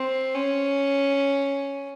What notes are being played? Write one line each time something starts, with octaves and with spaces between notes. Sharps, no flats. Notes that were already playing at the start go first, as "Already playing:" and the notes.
Already playing: C4
C#4